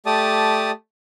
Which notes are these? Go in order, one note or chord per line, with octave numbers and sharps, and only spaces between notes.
A3 G4 D5 A5 D#6